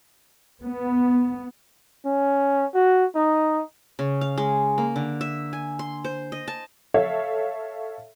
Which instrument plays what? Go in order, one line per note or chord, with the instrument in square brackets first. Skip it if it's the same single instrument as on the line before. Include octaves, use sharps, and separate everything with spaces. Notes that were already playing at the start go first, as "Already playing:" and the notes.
[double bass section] B3
[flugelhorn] C#4
F#4
D#4
[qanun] C#3
F5
G#3
A#3
D3
E5
G#5
C6
C5
D#5
A5
[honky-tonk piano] A4 C#5 E5 F5